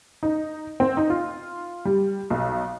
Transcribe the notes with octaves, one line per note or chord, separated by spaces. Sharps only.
D#4
C4
D#4
F4
G3
B1